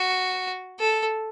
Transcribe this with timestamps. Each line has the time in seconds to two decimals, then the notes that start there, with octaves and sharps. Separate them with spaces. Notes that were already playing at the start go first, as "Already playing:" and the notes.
Already playing: F#4
0.79 A4